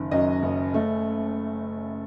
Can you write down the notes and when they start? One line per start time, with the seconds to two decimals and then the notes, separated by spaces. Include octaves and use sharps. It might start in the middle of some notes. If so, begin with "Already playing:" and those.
Already playing: F#1 D#3
0.11 F#2 D#5
0.42 F#1
0.74 A3